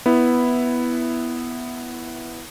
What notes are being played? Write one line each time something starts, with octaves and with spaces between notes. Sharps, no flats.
B3 E4